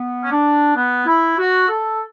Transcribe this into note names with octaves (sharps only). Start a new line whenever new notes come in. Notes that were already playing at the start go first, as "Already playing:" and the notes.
Already playing: B3
C#4
D4
B3
E4
F#4
A4